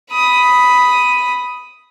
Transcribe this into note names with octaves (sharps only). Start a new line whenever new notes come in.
B5 D#6